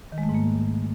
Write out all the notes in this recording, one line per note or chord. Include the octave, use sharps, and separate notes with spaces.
D#3
G#3
A3
G#2
A#3